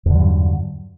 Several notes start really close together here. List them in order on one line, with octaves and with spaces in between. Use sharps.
E2 D3 F#3 G2